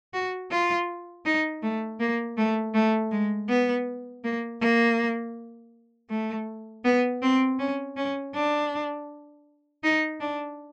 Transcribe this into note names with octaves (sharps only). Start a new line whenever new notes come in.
F#4
F4
D#4
A3
A#3
A3
A3
G#3
B3
A#3
A#3
A3
B3
C4
C#4
C#4
D4
D#4
D4